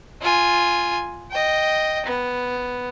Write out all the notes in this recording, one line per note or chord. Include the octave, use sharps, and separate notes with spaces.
F4 G#5
D#5 G5
B3